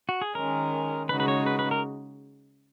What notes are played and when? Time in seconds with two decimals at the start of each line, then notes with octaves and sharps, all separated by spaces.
0.09 F#4
0.22 G#4
0.35 D#3 G#3 C#4 A#4
1.09 C#3 G#3 D#4 F#4 B4
1.20 B4
1.28 C#5
1.46 B4
1.59 B4
1.71 A#4